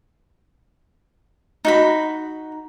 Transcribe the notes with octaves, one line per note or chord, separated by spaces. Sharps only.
D#4 F#4 B5